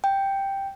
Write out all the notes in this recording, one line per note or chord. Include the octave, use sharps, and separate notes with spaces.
G5